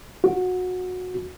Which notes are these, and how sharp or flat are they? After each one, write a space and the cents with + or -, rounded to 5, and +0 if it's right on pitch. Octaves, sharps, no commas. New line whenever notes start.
F#4 -20